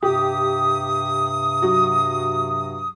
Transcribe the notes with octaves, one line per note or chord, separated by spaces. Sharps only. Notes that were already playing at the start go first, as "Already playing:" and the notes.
G2 C3 G4 D#6
F#3